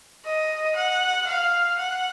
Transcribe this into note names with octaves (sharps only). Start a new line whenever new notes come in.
D#5
F#5
F5
F#5